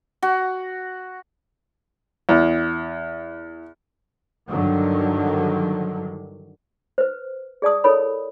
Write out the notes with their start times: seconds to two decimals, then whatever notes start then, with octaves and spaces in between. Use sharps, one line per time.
0.22 F#4
2.29 E2
4.49 G2 D3 D#3 F#3
6.98 B4 C5
7.62 G#4 D5 A5 D#6
7.84 E4 A4 A#4 C#5 B5